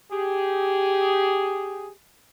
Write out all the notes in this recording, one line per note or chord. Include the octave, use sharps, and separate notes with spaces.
G4 G#4